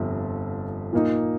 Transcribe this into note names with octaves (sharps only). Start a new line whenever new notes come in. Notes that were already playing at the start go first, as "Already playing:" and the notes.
Already playing: G1 F2 C3
A#2 A#3 D#4